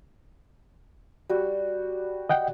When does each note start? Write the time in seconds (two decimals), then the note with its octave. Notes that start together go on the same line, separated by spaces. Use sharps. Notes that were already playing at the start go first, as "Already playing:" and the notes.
1.29 G3 F#4
2.29 D#5 F#5 G5